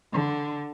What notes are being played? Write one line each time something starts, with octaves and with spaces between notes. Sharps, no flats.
D3